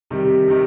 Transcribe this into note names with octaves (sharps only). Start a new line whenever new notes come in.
C3 D#3 G3
C3 D#3